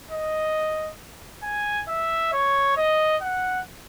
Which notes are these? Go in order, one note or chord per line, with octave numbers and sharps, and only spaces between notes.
D#5
G#5
E5
C#5
D#5
F#5